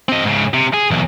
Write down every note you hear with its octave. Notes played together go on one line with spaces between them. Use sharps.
C4 D#5
G#2 C#3
C3
G#4
B1 E2